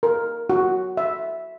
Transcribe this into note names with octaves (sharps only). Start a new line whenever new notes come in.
A#4
F#4
E5